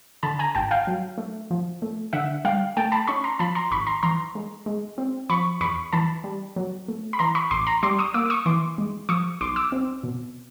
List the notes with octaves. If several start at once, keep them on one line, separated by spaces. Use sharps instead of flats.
D3 A5 B5
G#5 A#5
G#1 G5 A5
F5 G5
F#3
A3
F3
A3
D3 E5 F#5
G3 F5 G5
A3 G5 A5
A5 B5
C#4 B5 C#6
A#5 C6
F3 A5 B5
A#5 C6
G#1 B5 C#6
A#5 C6
E3 A#5 C6
G#3
G#3
C4
F3 B5 C#6
E2 B5 C#6
E3 A5 B5
G3
F#3
A3
B5
E3 A#5 C6
B5 C#6
A1 C6 D6
A#5 C6
G3 C6 D6
C#6 D#6
A#3 D6 E6
D6
C#6 D#6
E3 C6 D6
G#3
F3 C#6 D#6
B1 C6 D6
D6 E6
C4
B2